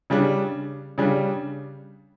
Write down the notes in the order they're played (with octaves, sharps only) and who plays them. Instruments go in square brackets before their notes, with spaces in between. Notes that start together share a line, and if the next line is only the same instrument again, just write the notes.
[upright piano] C#3 G3 D4
C#3 G3 D4